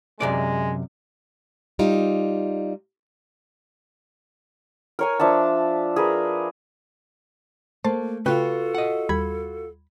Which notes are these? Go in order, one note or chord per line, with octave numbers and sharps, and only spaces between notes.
F#2 C3 G#3 D5
G3 D#4 F4
A#4 C#5 G#5
F3 D4 E5 A5
G#4 A#4 B4
A3 A#3 C5 A5
C#3 F4 F#4 A4 B4 G5 F#6
D#5 F#5
D#2 G3 B5 G#6